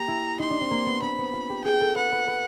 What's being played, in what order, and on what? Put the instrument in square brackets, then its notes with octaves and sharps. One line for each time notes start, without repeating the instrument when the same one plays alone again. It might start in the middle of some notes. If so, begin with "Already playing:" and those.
Already playing: [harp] A#3 G4 [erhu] A#5
[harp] E4
[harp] D#4 [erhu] C6
[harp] D4
C4
A#3
B3
[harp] C4 [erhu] B5
[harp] B3
F4
G4
[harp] G#4 [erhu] G5
[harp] A4
[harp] B4 [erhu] F#5
[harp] B4
B4